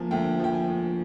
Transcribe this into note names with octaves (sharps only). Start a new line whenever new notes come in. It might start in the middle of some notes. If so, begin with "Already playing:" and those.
Already playing: D2 F3 A#3 G#5 A5
D2 G5
F3 G5
G#5
D2